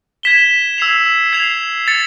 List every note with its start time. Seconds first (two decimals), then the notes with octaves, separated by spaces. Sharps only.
0.23 G#6 B6 E7 G7
0.78 E6 G#6 C7 F7
1.33 G#6 C7 F7
1.87 A6 C#7 F7